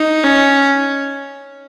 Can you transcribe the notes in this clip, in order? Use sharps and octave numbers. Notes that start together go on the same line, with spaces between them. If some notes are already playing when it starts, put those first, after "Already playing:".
Already playing: D#4
C#4